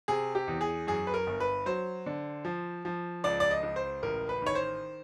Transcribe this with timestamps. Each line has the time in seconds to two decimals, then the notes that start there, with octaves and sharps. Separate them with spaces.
0.08 C3 G#4
0.35 G4
0.48 E2
0.61 G#4
0.87 F#2 G#4
1.07 B4
1.14 A#4
1.27 G1
1.40 B4
1.66 F#3 C5
2.06 D3
2.45 F3
2.85 F3
3.24 C#2 D5
3.40 D5
3.51 D#5
3.63 C#2
3.76 C5
4.02 A1 A#4
4.29 B4
4.42 D#3 C#5
4.55 C5